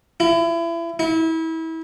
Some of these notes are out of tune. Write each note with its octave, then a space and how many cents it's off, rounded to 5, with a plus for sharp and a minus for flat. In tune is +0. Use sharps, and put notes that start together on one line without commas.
E4 +30
E4 -30